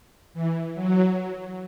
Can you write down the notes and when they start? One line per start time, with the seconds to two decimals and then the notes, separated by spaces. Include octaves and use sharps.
0.34 E3
0.75 F#3